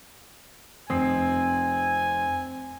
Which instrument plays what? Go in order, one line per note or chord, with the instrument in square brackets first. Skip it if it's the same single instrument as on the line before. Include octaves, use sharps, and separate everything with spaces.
[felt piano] F1 D#6 C7 [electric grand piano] C4 [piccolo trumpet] G#5